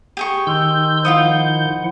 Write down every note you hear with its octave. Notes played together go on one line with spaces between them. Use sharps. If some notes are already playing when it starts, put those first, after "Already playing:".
G4 G#4 C#6
D#3 C6 E6 G6
F3 E4 F4 F5 F#5 D#6